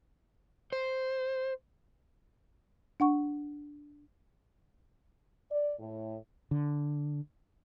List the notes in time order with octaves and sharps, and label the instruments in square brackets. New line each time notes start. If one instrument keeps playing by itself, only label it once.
[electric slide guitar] C5
[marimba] D4 F#5 C#6
[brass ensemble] D5
A2
[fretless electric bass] D3